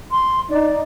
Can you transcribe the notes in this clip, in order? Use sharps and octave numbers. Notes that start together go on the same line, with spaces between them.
C6
D#4 D5